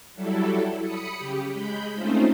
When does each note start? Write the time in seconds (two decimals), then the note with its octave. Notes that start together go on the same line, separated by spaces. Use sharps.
0.14 F#3 G3 E4 A4
0.82 B5 D#6 C#7
1.17 C#3 G4
1.52 G#3 B5 G6
1.93 A3 C4 C#4 D#4 F4 C5